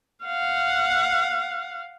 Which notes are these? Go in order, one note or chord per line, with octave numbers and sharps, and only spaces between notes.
F5 F#5